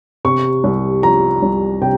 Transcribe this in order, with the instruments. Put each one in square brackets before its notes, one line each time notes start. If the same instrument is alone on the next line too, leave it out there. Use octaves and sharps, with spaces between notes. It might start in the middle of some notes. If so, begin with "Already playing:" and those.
[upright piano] C3 C#6
C2
F3 A#5
C2
C3 G5